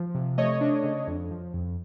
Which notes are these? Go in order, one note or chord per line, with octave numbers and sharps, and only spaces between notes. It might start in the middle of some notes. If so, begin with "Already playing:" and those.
Already playing: F3
C3
A3 C#5 D#5
D4
C#3
F2
F3
F2